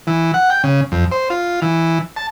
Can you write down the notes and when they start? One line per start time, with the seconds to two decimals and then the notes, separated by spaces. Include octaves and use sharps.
0.07 E3
0.34 F#5
0.50 G5
0.64 C#3
0.92 F2
1.12 C5
1.30 F4
1.62 E3
2.16 A5